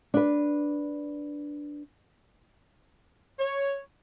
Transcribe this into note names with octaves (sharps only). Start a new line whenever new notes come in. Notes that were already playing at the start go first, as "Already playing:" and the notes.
D4 B4
C#5